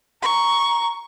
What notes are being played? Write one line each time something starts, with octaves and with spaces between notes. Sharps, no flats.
A#5 C#6